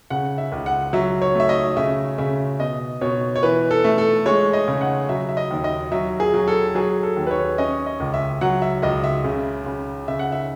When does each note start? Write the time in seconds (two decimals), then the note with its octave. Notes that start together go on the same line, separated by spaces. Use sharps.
0.10 C#3 F#5
0.38 E5
0.52 C#2
0.66 F#5
0.93 F#3 E5
1.22 C#5
1.35 A3 E5
1.49 D#5
1.77 C#3 E5
2.18 C#3 E5
2.60 B2 D#5
3.01 B2 C#5
3.36 C#5
3.43 E3 B4
3.71 A4
3.84 A3
3.98 A4
4.26 G#3 C#5
4.53 D#5
4.68 C#3
4.81 F#5
5.09 F#3 E5
5.29 E5
5.37 D#5
5.51 D#2
5.64 D#5
5.92 F#3 E5
6.20 G#4
6.34 F#3
6.48 A4
6.75 F#3 G#4
7.03 A4
7.17 D#2
7.27 B4
7.31 C#5
7.58 C#4 D#5
7.86 D#5
8.00 C#2
8.14 E5
8.41 F#3 F#5
8.62 E5
8.82 C#2 D#5
9.04 E5
9.24 C#3
9.66 C#3
10.08 C#3 E5
10.19 F#5
10.32 E5